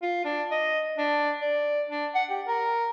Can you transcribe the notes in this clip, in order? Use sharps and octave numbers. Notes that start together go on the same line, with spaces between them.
F4
D4
D#5
D4
D5
D4
F#5
G4
A#4